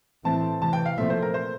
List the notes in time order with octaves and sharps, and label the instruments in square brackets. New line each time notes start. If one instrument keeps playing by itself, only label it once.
[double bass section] A2 E3 A3 C4 [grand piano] A5
[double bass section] C3 E3 A3 [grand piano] A5
[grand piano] G5
F5
[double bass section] A#2 F3 A3 C4 [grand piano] E5
[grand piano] C5
A#4
C5